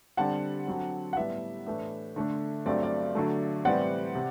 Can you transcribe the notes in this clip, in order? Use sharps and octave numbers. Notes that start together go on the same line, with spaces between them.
D3 G3 C4 F#5 A5
D3 F#3 C4
F#5
A2 G3 B3 E5
A2 E3 A3 D4
D3 A3 D4
G2 F#3 A3 C4 D5
D5
D3 F#3 A3
A2 E3 G3 C4 D5 F#5
C3